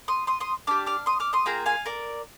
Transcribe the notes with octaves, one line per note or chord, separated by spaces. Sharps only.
C6 D#6
C6 D#6
C6 D#6
D4 G4 D6 F6
D6 F6
C6 D#6
D6 F6
C6 D#6
A#3 F4 G#4 G5 A#5
F5 G#5
A#4 D5